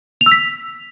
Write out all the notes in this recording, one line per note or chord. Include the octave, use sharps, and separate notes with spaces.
F7
E6
B6